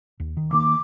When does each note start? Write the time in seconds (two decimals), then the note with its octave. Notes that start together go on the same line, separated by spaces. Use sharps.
0.20 D#2
0.37 D#3
0.53 D#3 A#3 D6